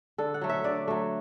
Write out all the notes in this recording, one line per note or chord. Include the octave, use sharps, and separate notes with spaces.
D3 A4
F#5
F#3 A3
E5
D3 D5
F#3 A3